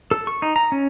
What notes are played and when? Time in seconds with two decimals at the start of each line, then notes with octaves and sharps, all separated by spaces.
0.11 A4
0.27 C#6
0.42 D#4
0.56 A#5
0.72 C#4